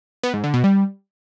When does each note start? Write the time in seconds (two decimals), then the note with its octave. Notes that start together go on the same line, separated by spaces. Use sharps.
0.23 B3
0.34 G#2
0.44 D3
0.54 B2
0.64 G3